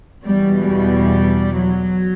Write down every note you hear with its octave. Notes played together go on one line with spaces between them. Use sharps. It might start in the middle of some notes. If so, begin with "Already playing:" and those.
E2 B2 G3
G3
F#3